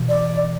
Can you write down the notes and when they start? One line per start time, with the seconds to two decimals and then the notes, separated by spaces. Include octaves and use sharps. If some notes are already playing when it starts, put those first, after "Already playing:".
Already playing: B2 E3
0.09 D5